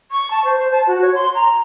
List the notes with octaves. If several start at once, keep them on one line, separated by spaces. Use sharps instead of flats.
C#6
A5
C5
C5
A5
F#4
C#5
C6
A#5